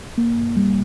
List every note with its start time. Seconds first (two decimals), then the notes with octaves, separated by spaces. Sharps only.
0.18 A#3
0.37 G2
0.56 G3